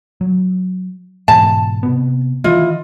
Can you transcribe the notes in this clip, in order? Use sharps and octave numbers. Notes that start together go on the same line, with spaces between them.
F#3
G#2 B2 E3 A5
C3 B3
D#3 E3 E4 F4 D#5